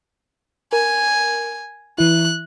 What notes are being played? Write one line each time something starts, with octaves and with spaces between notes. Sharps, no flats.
A#4 G#5
E3 E4 F#6